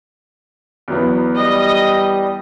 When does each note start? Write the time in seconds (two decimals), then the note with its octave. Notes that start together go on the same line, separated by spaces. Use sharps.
0.88 E2 F#3 B3
1.36 G3 D#5